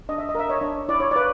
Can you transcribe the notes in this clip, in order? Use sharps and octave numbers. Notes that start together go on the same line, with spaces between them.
D4 D#5
E5
D#5
A#4 E5
C#5 D#5
D4
E4 D5
C#5
B4 D5